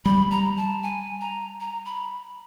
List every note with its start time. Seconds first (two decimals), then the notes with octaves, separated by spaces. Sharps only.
0.05 G3 B5
0.31 A#5
0.57 A5
0.83 G#5
1.21 A#5
1.60 A#5
1.85 B5